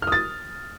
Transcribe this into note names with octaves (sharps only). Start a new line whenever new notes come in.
D#6 F6 A6